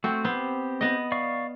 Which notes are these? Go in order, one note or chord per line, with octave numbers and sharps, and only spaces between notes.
A3 C4 F#4
B3 C4 G4 C5
B3 D#5
D5 F5 C#6